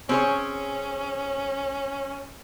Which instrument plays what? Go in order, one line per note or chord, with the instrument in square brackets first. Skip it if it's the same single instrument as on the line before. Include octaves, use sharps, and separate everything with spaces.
[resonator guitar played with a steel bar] C4 G#4 C#5 [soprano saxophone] C#4